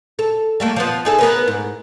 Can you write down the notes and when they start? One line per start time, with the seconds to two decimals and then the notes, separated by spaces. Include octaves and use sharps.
0.19 A4
0.60 G3 A3 A#3
0.76 F3 B3
1.05 D#4 G#4 A4
1.19 B3 A#4 B4
1.48 G#2